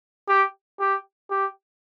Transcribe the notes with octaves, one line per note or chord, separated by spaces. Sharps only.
G4
G4
G4